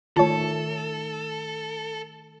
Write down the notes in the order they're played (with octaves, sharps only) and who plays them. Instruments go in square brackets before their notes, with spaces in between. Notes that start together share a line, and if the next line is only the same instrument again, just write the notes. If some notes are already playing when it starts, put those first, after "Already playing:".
[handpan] D#3 A3 [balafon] F4 [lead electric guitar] A4 [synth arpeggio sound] C#5 A5